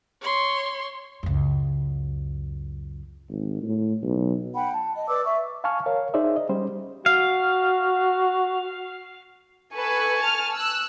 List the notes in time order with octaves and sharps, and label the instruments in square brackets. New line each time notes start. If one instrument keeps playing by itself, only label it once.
[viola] C#5 C6
[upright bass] C#2 F#2
[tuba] G#1
A2
B1
[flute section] F#5 G5 B5
A5
D#5
B4 D5 D6 E6
E5 C#6
[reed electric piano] F5 G#5 A5 C#6 F6
A#4 C#5 F5
D#4 G#4 C5 D5 E5
D#5
G3 C#4 C5
[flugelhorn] F#4 [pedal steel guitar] F5
[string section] A4 B4 [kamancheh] G#5 C#6
[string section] A5 F6
E6 F#6